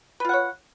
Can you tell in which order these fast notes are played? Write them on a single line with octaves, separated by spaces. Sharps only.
B4 F4 F#5 C#5